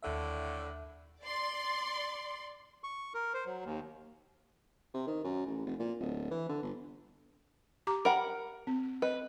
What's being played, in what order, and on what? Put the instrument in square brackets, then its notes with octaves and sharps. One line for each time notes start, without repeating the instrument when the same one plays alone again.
[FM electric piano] D#2 E5 [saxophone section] A2 D3
[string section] D5 C6
[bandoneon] C#6
A#4
C5
F#3
D#2
[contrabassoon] C3
D#3
F#2
A1
F1
A#2
D1
E3
D3
G1
[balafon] G4 A#5 D6
[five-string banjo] A#4 F#5 [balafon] G5 A#5 B5
[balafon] C4
[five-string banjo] B4 [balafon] D#5